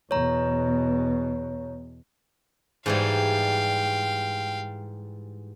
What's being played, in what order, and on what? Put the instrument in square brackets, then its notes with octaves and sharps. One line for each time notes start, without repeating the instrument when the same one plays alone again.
[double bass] E2 B2 [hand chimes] C#5 A#5
[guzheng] G#2 E3 G3 [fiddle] F5 G5